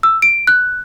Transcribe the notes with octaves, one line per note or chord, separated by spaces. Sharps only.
E6
D7
F#6